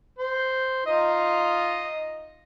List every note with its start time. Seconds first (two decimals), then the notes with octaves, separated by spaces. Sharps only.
0.19 C5
0.86 D#4 F4 D#5